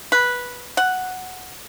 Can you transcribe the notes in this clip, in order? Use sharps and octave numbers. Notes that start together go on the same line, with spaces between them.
B4
F#5